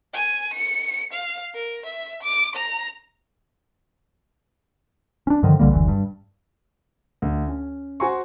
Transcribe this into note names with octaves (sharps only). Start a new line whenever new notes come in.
G#5
C#7
F5
A#4
E5
D6
A#5
C#4 D4
G2 D3 D#3 F3
B1 D3 G3 A#3
F#1 D2 E3
G2
D2
C#4
F#4 C5 G#5 A#5 C6 C#6